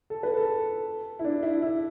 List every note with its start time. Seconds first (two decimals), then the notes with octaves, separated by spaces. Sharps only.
0.10 A4
0.23 B4
0.37 A4
1.19 E4
1.25 D4
1.43 E4
1.62 E4